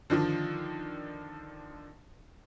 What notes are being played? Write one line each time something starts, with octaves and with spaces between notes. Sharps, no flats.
D3 D#3 F3 D4